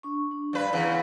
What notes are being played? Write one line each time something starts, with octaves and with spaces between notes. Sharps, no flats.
D4 C#6
D4
G2 B4 D5 F5
E2 C#3 F5 F#5